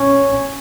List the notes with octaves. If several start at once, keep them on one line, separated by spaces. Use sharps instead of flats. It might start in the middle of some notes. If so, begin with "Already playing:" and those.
Already playing: C#4